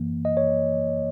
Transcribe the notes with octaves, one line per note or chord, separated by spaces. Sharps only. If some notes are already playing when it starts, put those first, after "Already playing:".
Already playing: F#2 E3 A#3
D#5
C#5